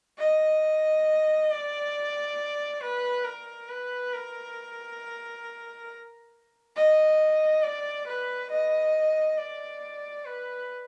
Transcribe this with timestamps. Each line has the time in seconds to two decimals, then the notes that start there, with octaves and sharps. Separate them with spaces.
0.19 D#5
1.50 D5
2.82 B4
3.25 A#4
3.69 B4
4.13 A#4
6.76 D#5
7.63 D5
8.07 B4
8.51 D#5
9.38 D5
10.26 B4